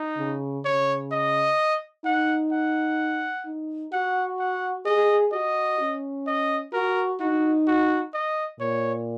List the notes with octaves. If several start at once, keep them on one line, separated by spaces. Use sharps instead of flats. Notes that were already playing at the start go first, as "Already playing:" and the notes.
Already playing: D#4
C#3
C#3 C#5
D#5
D#4 F#5
F#5
D#4
F#4 F#5
F#5
G#4 D#5
F#4 D#5
C#4
D#5
F#4 A#4
D#4 F#4
F#4
D#5
A#2 C#5